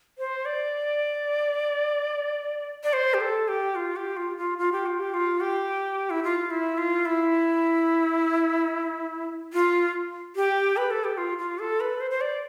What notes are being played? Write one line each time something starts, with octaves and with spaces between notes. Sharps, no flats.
C5
D5
D5
C5
G4
A4
G4
F4
G4
F4
F4
F4
G4
F4
G4
F4
G4
E4
F4
E4
F4
E4
F4
G4
B4
A4
G4
F4
F4
A4
B4
C5
C5
D5